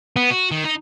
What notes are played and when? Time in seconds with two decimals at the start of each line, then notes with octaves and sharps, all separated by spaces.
0.16 B3
0.30 F#4
0.51 D#3
0.64 D#4